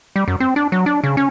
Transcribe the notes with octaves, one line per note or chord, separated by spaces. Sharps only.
G3
F#2
C4
D4
F#3
D4
C#3
C#4